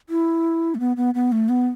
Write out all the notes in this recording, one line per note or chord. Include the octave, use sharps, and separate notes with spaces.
E4
A3
B3
B3
B3
A3
B3